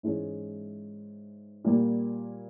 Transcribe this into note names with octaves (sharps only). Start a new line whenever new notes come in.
G#2 E3 G#3 C#4
A#2 G3 A#3